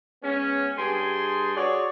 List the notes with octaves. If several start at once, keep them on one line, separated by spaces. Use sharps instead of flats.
G#3 B3 C#4
G2 G#4 G#5 C6
F#4 G#4 C#5 D5